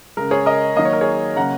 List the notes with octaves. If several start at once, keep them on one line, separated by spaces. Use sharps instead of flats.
C#3 G#3 A#4
G#4 C#5
A#4 D#5
D#3 F#3 A#3 D#5
C#5
A#4
G#4 C#5
C#3 F#3 A#3 F#5 A#5